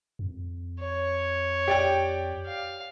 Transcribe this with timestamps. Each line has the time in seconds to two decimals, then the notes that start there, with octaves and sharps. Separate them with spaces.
0.19 F2
0.80 C#5
1.68 G4 D5 G5
2.46 F5